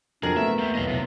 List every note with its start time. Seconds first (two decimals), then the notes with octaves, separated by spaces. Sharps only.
0.23 F2 C3 F#3 D4 G#4 A#4
0.37 A3 B3 A4 E5
0.59 A#3 G4
0.75 B1 E2 E3 D#5 F5
0.88 C3